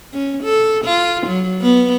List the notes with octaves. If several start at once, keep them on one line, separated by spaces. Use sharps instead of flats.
C#4
A4
F4
F#3
B3